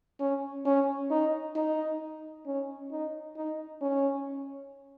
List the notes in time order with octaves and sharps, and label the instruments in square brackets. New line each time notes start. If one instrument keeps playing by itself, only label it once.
[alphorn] C#4
C#4
D#4
D#4
C#4
D#4
D#4
C#4